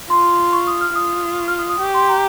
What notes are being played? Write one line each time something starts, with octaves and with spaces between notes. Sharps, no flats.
F4 C6
C#6
D#6
F6
F4 D#6
C#6
F6
D#6
D#6
G4 C#6
C6
A#5